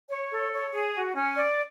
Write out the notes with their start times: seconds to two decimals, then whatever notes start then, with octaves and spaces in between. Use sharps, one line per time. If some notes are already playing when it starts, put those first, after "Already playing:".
0.10 C#5
0.30 A4
0.52 C#5
0.72 G#4
0.94 F#4
1.16 C#4
1.36 D5